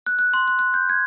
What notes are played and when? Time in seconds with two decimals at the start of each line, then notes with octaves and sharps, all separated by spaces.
0.07 F#6
0.19 F#6
0.34 C6
0.48 F#6
0.59 F#6
0.74 G6
0.89 G#6